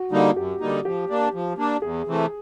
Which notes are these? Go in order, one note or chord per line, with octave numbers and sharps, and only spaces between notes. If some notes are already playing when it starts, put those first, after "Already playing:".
Already playing: F#4
D3 G3 A#3 D#4 F#4
F#2 G4
D3 G3 A#3 D#4
F3 G4
A#3 D4
F3
A#3 D4
E2 G#4
C3 E3 A3